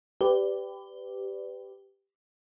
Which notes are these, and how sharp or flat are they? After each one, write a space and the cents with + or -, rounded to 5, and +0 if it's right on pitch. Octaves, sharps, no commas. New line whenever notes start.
G4 +0 B4 +25 D5 -5